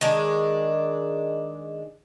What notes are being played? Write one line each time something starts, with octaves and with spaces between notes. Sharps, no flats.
D#3 G#3 D4